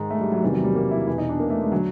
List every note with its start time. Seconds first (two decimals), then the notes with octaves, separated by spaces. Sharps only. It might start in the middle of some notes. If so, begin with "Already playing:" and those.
Already playing: G#2 D#3
0.10 A3
0.21 G3
0.32 F#3
0.42 E2 C3 D#3 G3
0.53 F#3
0.64 G3
0.75 A#3
0.91 E4
1.07 E2 E4
1.10 B2
1.18 D#4
1.29 D4
1.40 A#3
1.50 A3
1.61 G#3
1.72 D3 F#3